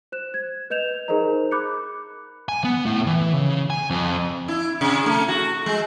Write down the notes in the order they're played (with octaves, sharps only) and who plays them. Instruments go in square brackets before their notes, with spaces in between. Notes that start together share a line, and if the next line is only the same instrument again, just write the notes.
[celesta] C5 F#6 E7
G#6
B4 D#5 G6 E7 F7
D#4 G#4 A#4 C5 D#5 A#5
B5 D6 F#6 G6 C#7
[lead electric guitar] G#5
B3
A2
E3
C#3
G#5
F2
[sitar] E4
C3
A3
F#4
G#3